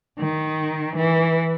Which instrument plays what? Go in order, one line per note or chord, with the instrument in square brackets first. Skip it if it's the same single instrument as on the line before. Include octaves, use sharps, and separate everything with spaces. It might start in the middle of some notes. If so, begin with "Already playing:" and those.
[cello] D#3
E3